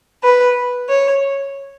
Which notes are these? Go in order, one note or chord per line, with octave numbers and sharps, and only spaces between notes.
B4
C#5